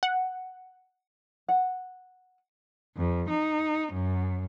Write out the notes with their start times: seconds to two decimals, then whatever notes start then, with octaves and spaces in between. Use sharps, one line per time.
0.03 F#5
1.48 F#5
2.97 F2
3.29 D#4
3.92 F#2